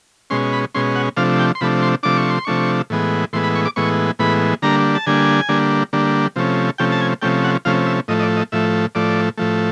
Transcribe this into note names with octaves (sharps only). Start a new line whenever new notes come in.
B2 G#3 C#4 C6
B5
B2 G#3 C#4 C6
F#5
C3 F3 A3 D4 F5
G5
C6
C3 F3 A3 D4 B5
C6
C3 F3 A3 D4 D6
C#6
C6
C3 F3 A3 D4 C#6
A2 E3 G#3 B3
A2 E3 G#3 B3 C6
B5
C#6
D6
A2 E3 G#3 B3 C#6
A2 E3 G#3 B3 B5
D3 G3 A#3 D4 A#5
A5
D3 G3 A#3 D4 G#5
D3 G3 A#3 D4
D3 G3 A#3 D4
C3 F3 A3 C#4
C3 F3 A3 C#4 G5
A5
G#5
C3 F3 A3 C#4 G5
F#5
C3 F3 A3 C#4 F5
E5
A2 F3 A3 D#5
D#5
D5
D#5
A2 F3 A3 E5
A2 F3 A3 D5
A2 F3 A3